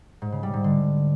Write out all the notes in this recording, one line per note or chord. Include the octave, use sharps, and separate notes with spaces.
G#2
C#3
G3
G#2
D3